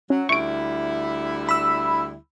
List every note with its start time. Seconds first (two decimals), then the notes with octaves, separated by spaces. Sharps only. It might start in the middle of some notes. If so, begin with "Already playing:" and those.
0.10 F#3 C#4
0.29 D2 G3 E4 C#6 D7
1.49 B5 E6